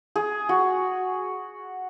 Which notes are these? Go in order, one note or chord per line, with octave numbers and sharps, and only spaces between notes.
G#4
F#4